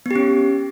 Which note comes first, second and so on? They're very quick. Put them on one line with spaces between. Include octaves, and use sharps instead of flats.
B3 G4 C#4